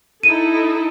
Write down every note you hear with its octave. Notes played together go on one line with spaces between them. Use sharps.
D#4 E4 A4 D#7